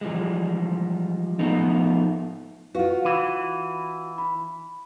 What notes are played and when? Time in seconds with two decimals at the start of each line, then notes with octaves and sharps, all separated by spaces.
0.01 E3 F3 G3 G#3
1.39 F3 A3 B3 D#4
2.75 F4 F#4 B4 F5
3.05 E3 D#7
4.18 B5